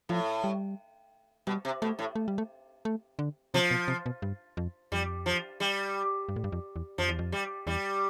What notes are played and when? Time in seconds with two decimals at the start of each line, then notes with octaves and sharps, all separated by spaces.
0.09 A2 F3
0.44 G3
1.47 B2 G3
1.65 C3
1.82 B2 A3
1.99 A2
2.16 A3
2.28 G3
2.38 A3
2.85 A3
3.19 D3
3.54 C3 F3
3.71 B2
3.88 C3
4.06 B2
4.22 G2
4.57 F2
4.92 F2 G3
5.26 F3
5.60 G3
6.29 G2
6.36 A2
6.44 G2
6.52 F2
6.76 E2
6.98 F2 F3
7.09 E2
7.19 F2
7.32 G3
7.67 E2 G3